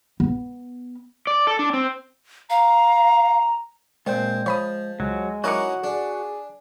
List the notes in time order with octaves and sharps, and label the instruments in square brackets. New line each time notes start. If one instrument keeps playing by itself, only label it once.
[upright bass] B3
[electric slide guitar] D5
A4
D4
C4
[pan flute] F5 [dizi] A#5
[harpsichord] A#2 C4 [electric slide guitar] G#3 C5
[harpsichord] F3 [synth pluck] C#5 B5 D#6
[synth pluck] C#2 [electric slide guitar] F#3 [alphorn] G#3
[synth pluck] F#3 A#4 D6 [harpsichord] C#4 D#4 E4 [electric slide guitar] F#4 F#5
[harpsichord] D4 [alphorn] G#4